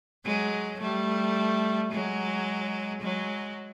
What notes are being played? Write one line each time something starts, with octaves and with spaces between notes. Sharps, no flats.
F#3 G#3
G3 A3
F#3 G#3
F#3 G#3